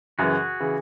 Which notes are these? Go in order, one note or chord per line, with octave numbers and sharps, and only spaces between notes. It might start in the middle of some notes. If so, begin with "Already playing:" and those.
F#2 C#3 E3 F#4 G#4
C#3 E3